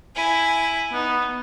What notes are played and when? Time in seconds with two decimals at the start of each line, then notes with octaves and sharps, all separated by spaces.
0.16 E4 G#5
0.93 B3 D#4